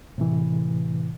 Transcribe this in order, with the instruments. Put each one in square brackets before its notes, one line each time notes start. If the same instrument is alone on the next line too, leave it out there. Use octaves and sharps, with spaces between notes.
[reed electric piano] A2 C3 E3